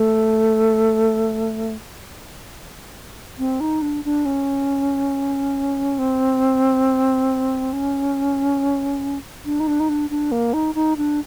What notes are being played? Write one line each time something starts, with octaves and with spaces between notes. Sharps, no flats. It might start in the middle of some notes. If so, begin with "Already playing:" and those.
Already playing: A3
C4
D#4
D4
D4
C#4
C4
C#4
D4
D#4
D4
D#4
D4
D4
A#3
D#4
D#4
D4